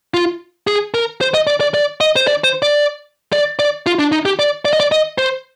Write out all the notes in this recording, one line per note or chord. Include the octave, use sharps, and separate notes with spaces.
F4
G#4
A#4
C5
D#5
D5
D5
D5
D#5
C5
D5
C5
D5
D5
D5
F4
D4
D#4
G4
D5
D5
D#5
D5
D#5
C5